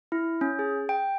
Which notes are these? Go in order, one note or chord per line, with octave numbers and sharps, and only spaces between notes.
E4
C#4
G#4
G5